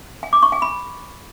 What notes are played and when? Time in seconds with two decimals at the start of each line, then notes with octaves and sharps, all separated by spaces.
0.23 G#5
0.33 D6
0.42 C#6
0.52 G#5
0.62 B5